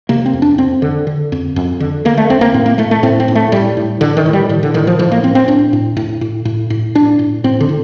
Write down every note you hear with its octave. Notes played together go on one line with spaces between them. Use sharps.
C3 A#3
C4
F2
D4
F2 C4
D3
D3
F2
F2
D3
D3 A#3
A3
F2 C4
A#3
A2 C4
A#3
A2 A3
A3
A2 C4
C4
A2
A3
A2 G3
A2
A2 D3
D#3
A2
G3
A2 D#3
D3
A2 D#3
F3
A2 F3
A#3
A2 C4
C4
A2 D4
A2
A2
A2
A2
A2
A2 D4
A2
A2 C4
D3
A2